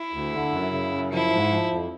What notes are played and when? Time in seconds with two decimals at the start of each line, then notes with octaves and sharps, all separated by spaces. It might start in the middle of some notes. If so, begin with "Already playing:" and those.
Already playing: E4
0.13 D2
0.33 D3
0.52 F#2
0.72 C#3
0.93 F#2
1.12 F3 E4
1.32 G#2
1.52 F3
1.71 F2